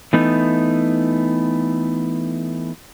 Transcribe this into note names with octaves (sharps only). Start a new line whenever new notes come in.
E3 A3 B3 D#4